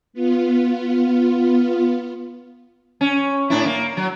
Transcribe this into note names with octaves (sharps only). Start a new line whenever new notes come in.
B3 F4
C#4
A2 D4 E4
A#3
F#3